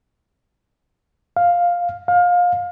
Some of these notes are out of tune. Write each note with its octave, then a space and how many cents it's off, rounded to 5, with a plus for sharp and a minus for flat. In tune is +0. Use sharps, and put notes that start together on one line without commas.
F5 +5
F5 +25